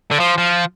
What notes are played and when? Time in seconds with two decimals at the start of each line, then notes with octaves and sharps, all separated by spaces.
0.11 D3
0.20 F3
0.38 F3